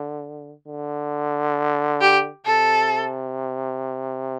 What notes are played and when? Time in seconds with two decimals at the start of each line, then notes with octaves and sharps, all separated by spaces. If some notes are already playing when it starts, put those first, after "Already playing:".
Already playing: D3
0.67 D3
2.01 G4
2.46 C3 A4